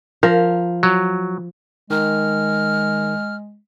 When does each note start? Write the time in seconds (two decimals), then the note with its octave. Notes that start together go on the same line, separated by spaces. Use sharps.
0.23 F3 A#4
0.83 F#3
1.90 D#3 G#3 A#4 F6